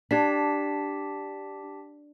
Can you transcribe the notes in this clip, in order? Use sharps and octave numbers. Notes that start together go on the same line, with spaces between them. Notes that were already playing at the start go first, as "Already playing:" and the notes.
D4 G4 A5 B6